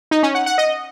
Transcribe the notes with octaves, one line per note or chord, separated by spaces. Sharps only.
D#4
C#4
F#5
F#5
D#5